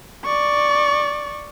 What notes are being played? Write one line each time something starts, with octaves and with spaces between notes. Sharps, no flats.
D5 C#6